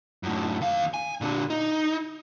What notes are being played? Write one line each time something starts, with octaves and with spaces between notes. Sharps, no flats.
F#2 A2
D#2 F5
G#5
A#2 D3
D#4